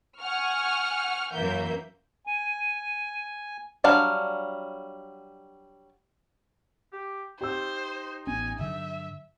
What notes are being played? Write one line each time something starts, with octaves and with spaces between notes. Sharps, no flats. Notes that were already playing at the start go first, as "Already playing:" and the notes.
F#5 G#5 C#6 F6
F#2 E3 A#3 E5 G6
G#5 D#7
F#3 G3 D4 F5 F#5
G4
D#4 G4 C5 E6
A1 B3 C#4 G#5
G2 D3 F#3 E5